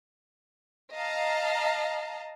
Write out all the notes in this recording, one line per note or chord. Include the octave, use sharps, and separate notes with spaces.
D#5 F5 A5 A#5